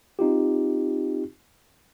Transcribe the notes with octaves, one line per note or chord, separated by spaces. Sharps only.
C4 D#4 F4 G4